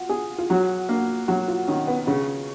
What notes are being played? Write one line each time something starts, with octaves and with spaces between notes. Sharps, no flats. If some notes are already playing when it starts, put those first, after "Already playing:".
Already playing: F4 F#4
G#4
F4
F#3 F#4
A#3
F#3 F#4
F4
D#3 C#4
B3
C#3 C#4